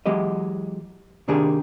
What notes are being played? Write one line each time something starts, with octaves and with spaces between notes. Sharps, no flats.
E3 F#3 G#3 G4 D#5
C3 D#3 A#3 D4 G4 G#4